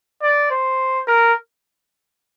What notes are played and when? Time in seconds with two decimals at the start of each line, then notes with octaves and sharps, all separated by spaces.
0.22 D5
0.51 C5
1.07 A#4